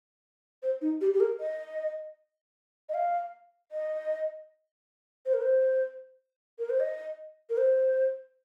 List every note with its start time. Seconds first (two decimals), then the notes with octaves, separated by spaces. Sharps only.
0.63 C5
0.81 D#4
1.01 G4
1.14 G4
1.20 A#4
1.40 D#5
2.89 D#5
2.94 F5
3.72 D#5
5.26 C5
5.34 A#4
5.41 C5
6.59 A#4
6.70 C5
6.80 D#5
7.50 A#4
7.57 C5